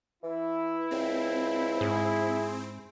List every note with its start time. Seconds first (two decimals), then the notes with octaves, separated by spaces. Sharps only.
0.23 E3 E4
0.91 C#2 C4
1.81 G#2 G#4